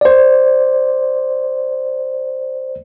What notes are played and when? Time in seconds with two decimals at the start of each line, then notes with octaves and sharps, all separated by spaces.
0.01 C5 D5